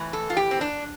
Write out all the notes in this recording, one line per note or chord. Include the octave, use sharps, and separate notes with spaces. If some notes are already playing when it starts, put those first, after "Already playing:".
Already playing: A2 E3
A4
F4
G4
C4
D4